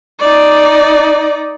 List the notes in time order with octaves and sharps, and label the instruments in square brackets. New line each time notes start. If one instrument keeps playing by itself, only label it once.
[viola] D#4 D5